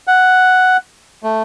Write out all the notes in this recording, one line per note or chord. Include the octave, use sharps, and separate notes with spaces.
F#5
A3